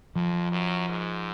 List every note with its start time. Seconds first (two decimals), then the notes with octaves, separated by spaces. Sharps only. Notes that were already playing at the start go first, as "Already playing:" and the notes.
0.16 F2 F3
0.52 F#2
0.89 G#2